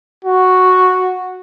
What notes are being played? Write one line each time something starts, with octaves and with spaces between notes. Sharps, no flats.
F#4